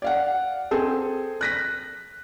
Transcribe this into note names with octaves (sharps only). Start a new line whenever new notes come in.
D5 F5 F#5
C4 G#4 A4
F#6 A#6 B6